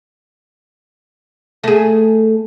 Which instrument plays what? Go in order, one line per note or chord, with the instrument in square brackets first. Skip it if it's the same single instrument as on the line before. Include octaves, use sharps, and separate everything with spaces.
[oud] A3 G#4